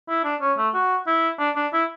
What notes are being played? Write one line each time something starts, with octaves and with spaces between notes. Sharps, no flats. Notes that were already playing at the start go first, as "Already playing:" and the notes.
E4
D4
C#4
A3
F#4
E4
D4
D4
E4